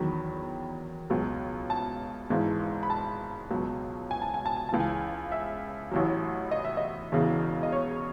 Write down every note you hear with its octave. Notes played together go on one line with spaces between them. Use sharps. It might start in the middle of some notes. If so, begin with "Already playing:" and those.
Already playing: E2 D#3 F#3 B5
C#2 B2 F#3
A5
G#1 G#2 E3
B5
A5
C#2 B2 F#3
G#5
A5
G#5
A5
G#5
C#2 C#3 E3 A5
G#5
E5
A1 A2 F#3
D#5
E5
D#5
E1 E2 C#3 E3
D#5
C#5